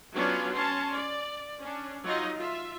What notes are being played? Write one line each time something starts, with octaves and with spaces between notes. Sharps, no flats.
F#3 B3 C#4 D4 F4
C#4 A5 C6
D5
C#4 D4
F#3 D#4 F4 D#5
F4 E5